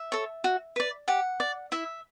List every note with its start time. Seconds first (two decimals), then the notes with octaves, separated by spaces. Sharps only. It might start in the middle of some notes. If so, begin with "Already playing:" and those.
Already playing: E5
0.12 A4 C#5
0.44 F#4
0.76 B4 D5
1.08 G4 F#5
1.40 D5
1.72 E4 E5